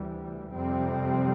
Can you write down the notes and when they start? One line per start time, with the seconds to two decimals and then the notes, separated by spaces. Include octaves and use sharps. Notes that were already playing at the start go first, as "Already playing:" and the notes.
Already playing: D2 C3 E3 G3
0.53 F2 C3 G3 C4